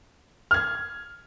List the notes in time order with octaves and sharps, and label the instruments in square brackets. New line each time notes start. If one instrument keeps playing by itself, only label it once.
[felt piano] F6 G#6